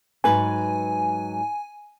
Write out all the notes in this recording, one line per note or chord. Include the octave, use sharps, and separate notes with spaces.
G#2 F#3 B4 G#5